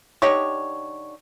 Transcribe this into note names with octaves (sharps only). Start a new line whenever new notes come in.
D3 D#4 G4 C#5